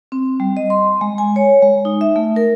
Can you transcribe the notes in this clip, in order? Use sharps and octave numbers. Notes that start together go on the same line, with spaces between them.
C4
G3
D#5
C6
G#3
G#5
C#5
G#3
D#4
E5
A3
A#4